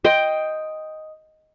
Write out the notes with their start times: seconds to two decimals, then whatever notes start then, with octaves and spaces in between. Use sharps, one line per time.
0.05 D#5 G5 C6